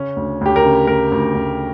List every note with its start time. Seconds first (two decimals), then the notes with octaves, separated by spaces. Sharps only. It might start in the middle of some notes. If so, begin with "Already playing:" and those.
Already playing: C#3 C#4
0.16 D2
0.41 D2 G4
0.56 A#4
0.65 C#3
0.87 D2 A#4
1.12 D2
1.35 D2